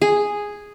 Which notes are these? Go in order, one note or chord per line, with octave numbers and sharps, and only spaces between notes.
G#4